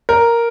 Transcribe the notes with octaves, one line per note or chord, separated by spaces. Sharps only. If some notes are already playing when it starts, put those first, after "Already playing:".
A#4